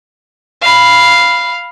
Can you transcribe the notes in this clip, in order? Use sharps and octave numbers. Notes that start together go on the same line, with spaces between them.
F5 B5